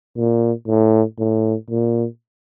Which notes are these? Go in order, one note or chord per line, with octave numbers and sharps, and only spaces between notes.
A#2
A2
A2
A#2